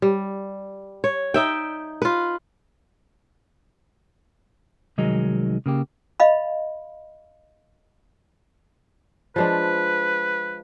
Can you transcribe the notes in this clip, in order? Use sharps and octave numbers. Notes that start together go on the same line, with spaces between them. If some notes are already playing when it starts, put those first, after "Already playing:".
G3
C#5
D#4 E5 G5
F4 B4
C2 D#3 F#3 G#3 D#4
C#3 A#3 G4
D#5 F5 B5
F3 G#3 D4 B4